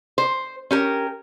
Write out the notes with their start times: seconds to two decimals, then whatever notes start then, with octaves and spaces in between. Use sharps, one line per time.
0.18 C5
0.71 C#4 G4 A#4